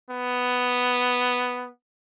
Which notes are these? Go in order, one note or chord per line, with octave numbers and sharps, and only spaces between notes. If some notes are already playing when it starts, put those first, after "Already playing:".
B3